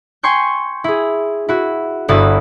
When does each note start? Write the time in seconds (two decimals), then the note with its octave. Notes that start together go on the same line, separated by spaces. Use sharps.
0.23 G5 G#5 C6 C#6 G6
0.84 E4 G#4
1.48 E4 F#4
2.08 G1 E4 F#4 D#6 A6 E7